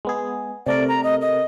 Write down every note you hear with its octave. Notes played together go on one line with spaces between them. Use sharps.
G#3 B3 G#4
C3 A3 A#4 D5
A#5
D#5
D#5